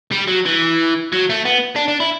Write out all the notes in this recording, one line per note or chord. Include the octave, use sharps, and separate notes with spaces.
G3
F#3
E3
F#3
A3
B3
D4
D4
E4